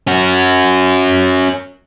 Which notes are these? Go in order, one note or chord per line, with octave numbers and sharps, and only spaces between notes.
C#4 F#4